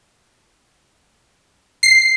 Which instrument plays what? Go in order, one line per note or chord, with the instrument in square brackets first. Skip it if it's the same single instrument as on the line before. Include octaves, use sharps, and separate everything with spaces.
[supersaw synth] C7